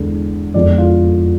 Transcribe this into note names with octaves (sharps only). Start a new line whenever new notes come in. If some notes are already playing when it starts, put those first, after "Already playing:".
Already playing: E2 D3 G#3
F2 D3 F3 G#3 B3 D5
F4